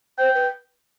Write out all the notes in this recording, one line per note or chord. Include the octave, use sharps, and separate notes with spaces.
C5 G5
B4